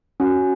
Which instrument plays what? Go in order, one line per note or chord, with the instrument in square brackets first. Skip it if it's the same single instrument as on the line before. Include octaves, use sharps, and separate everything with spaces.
[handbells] C#4 [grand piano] F#4